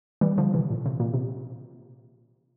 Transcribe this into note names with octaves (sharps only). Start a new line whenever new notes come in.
E3 G3
D3 F3
C3 E3
A#2
C3
A#2
C3